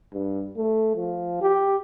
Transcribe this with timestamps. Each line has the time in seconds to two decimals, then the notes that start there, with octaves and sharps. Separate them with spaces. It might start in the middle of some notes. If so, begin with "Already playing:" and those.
0.13 G2
0.57 A3
0.96 F3
1.42 G4